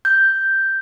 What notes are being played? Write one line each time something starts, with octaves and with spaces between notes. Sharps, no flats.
G6